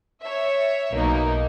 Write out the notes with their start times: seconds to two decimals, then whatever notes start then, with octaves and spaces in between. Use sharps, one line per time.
0.22 C#5 E5
0.92 B1 A#3 D#4